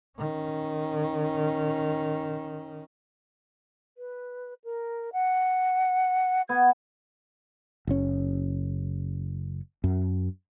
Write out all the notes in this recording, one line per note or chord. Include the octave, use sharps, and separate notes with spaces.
D#3 C#4
B4
A#4
F#5
B3 G#6
F#1 C#4
F#2